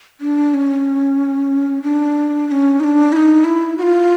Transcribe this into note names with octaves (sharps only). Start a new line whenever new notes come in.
D4
C#4
D4
D4
C#4
D#4
D4
E4
D#4
E4
F#4
F4